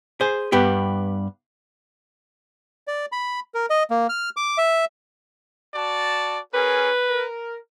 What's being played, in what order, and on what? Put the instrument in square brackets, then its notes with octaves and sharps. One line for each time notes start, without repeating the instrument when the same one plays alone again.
[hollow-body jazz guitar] G#4 C5
G2 B3 G4
[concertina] D5
B5
A#4
D#5
A#3
F6
D6
E5
[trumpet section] F#4 D5 A5
[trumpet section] C#4 G#4 A#4 [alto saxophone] B4
[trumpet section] A#4